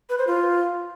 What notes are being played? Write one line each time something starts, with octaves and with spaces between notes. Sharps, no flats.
B4
C5
F4